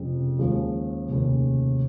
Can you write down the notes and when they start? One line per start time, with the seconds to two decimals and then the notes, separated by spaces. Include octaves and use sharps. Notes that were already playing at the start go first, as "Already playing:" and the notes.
Already playing: F1 F2 C#3
0.39 D#2 C#3 F3 G#3
1.09 F1 D#2 C#3